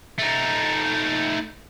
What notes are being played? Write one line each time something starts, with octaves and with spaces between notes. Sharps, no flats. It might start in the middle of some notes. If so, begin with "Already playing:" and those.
A3 D#4